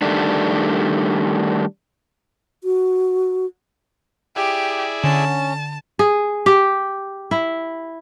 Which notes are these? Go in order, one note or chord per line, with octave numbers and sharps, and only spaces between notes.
D#3 G3 A3 D4
F#4
E4 G4 G#4 D5
D3 C#4 A5
G#4
G4
E4